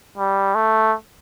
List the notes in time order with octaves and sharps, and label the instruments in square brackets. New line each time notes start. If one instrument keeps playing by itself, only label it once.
[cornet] G3
A3